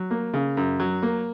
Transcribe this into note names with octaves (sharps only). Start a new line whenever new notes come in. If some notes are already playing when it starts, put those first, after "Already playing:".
Already playing: F#3
A#3
C#3
F#2
F#3
A#3